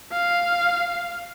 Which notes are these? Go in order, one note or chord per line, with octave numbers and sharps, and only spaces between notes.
F5